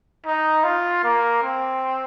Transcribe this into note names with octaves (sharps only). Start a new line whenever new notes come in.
D#4
F4
A#3
C4